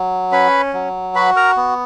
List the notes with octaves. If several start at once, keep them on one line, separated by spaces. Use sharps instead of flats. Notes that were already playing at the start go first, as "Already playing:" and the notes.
Already playing: F#3
C#4 B4 B5
F#3
F#4 B4 B5
A#4 A#5
B3